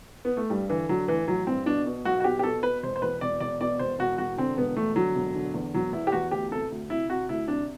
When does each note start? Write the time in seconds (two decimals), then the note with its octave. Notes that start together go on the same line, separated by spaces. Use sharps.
0.25 B3
0.37 A3
0.50 G2 G3
0.69 D3 E3
0.89 D3 F#3
1.08 A1 E3
1.27 A1 F#3
1.47 G2 C4
1.66 B2 D4
1.86 B2
2.05 B1 F#4
2.20 F#4
2.24 B2 G4
2.39 G4
2.43 B2 A4
2.63 B2 B4
2.83 E1 C5
2.96 C5
3.02 E2 B4
3.21 E1 D5
3.40 E1 D5
3.61 B2 D5
3.79 E1 C5
3.99 E1 F#4
4.18 E1 F#4
4.37 D3 C4
4.57 E1 B3
4.76 E2 A3
4.96 D3 F#3
5.15 E1
5.34 D3
5.54 E2
5.74 E1 F#3
5.93 E2 E4
6.07 G4
6.12 E2 F#4
6.31 D2 G4
6.52 C3 A4
6.71 D2
6.90 C3 E4
7.09 C3 F#4
7.29 D2 E4
7.48 C3 D4